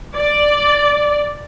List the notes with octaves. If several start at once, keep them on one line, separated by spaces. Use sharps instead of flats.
D5